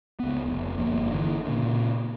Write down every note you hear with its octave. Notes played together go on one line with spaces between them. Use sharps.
C#2 B3
F1
G1 F3 A#3
D3 E3
A#2 C#3